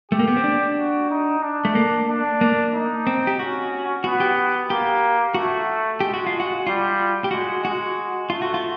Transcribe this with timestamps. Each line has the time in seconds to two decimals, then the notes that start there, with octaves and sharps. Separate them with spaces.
0.11 A3 G4
0.19 A#3
0.28 B3
0.37 C4
0.44 D4
0.77 F#4
1.10 D#4
1.42 D4
1.65 A3
1.75 A#3
2.08 D4
2.41 A#3
2.74 D#4
3.07 C4
3.27 G4
3.39 C#4 F#4
4.04 B3 F#4
4.20 G4
4.69 A#3 G4
5.34 A3 F#4
6.00 G#3 G4
6.14 F#4
6.27 F4
6.40 F#4
6.66 G3 F4
7.24 G4
7.31 G#3 F#4
7.64 G#3 F#4
8.30 A3 F4
8.42 F#4
8.54 F4